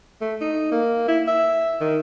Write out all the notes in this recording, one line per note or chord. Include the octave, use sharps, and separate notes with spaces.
A3
D#4
A#3
E4
E5
D#3